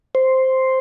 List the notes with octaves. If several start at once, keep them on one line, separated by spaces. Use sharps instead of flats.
C5